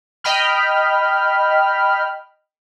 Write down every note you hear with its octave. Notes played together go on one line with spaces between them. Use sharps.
D#5 G5 B5 F6